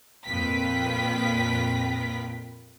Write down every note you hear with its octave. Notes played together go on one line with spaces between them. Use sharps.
F2 A#2 F4 B4 G5 B6